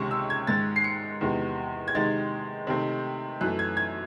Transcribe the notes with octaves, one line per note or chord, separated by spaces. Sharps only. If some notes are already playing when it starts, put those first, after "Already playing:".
Already playing: C#2 C3 D#3 G#3 C#4 C#6
E6
G#6
G#2 D#3 G#3 A6
C7
C#7
E2 C3 D#3 G#3
G#6
C3 D#3 G#3 D#4 A6
C3 D#3 A3 C4 D#4
F#2 E3 A3 F#6
G#6
G#6